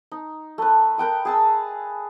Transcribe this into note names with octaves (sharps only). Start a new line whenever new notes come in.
D#4
A3 B4
A#4 B4 G5 D#6
G#4 A5 E6